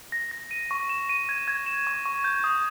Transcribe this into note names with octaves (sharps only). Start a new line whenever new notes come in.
A#6
A#6
D#7
C#6
E7
D#7
G#6
G#6
E7
C#6
C#6
G6
D#6